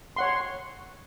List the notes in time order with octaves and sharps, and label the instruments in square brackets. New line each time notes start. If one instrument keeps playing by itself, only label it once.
[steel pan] C#5 F#5 C6